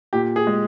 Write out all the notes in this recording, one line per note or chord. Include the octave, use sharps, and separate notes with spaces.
A#2 G4
G#4
G#3